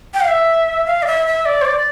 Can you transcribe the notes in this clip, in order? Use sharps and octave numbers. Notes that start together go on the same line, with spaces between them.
G5
F5
E5
F5
D5
E5
E5
D5
C5
D5